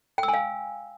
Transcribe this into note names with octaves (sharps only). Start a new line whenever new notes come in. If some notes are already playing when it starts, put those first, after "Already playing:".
G5
E6
G#5
F5